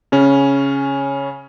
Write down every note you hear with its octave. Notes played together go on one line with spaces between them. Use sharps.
C#3 C#4